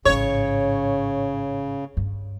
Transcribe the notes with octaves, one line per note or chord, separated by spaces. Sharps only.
A1 G#2 C#3 C#5
G2